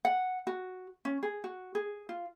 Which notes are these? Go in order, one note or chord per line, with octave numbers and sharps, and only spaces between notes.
F#5
F#4
C#4
G#4
F#4
G#4
F4